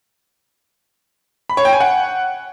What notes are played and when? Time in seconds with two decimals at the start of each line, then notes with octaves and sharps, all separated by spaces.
1.49 B5
1.57 C#5
1.65 G5
1.73 G#5
1.81 F#5